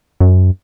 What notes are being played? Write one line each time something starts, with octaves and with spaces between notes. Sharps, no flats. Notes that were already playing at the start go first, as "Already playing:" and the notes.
F#2